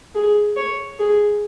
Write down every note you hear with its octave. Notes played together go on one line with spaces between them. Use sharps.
G#4
C#5
G#4